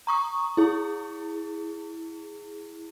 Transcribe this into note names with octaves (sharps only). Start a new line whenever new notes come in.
A#5 C#6 D#6
E4 G#4